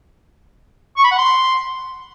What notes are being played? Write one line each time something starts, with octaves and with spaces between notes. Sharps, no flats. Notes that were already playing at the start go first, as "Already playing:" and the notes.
C#6
B5
F#5
C6